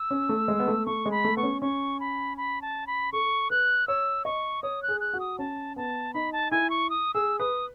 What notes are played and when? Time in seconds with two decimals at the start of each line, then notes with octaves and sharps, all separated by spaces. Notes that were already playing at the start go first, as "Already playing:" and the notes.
Already playing: E6
0.11 C#4
0.29 A3
0.48 G#3
0.60 B3
0.68 A3
0.86 A3 C#6
1.06 G#3
1.11 B5
1.24 A3
1.37 B3 C#6
1.43 C#4
1.62 C#4 C#6
2.00 B5
2.37 B5
2.62 A5
2.87 B5
3.12 A4 C#6
3.50 B4 F#6
3.87 C#5 E6
4.25 D#5 C#6
4.63 C#5 D#6
4.83 F#6
4.88 G#4
5.00 F#6
5.13 F#4
5.20 D#6
5.39 C#4 A5
5.76 B3 A5
6.14 D#4 B5
6.33 A5
6.51 E4 G#5
6.70 C#6
6.90 D#6
7.14 G#4 E6
7.39 B4 D#6